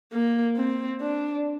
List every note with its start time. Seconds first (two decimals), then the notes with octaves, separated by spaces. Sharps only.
0.13 A#3
0.56 C4
1.01 D4